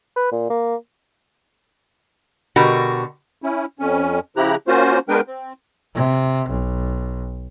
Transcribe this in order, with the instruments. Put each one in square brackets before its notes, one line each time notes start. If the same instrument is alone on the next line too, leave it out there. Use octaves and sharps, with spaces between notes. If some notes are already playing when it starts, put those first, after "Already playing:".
[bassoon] B4
A#2
A#3
[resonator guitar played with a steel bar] B2 D3 F#4 G4 A#4
[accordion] C#4 E4
F2 C#4
C#3 F3 E4 G4 A#5 F#6
A#3 C#4 F4 F#4 C5
G#3 B3 D4 A#4 B4 G5
C4
[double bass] C3
B1